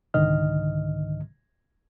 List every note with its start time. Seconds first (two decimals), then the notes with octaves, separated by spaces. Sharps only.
0.14 C2 G#2 D3 D#3 D#5 F6